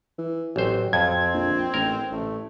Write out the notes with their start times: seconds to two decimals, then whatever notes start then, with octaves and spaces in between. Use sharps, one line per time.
0.18 E3
0.56 A1 F#3 C4 C5
0.93 F2 C4 G#6
1.34 A#1
1.74 A1 A#4
2.11 A1 A3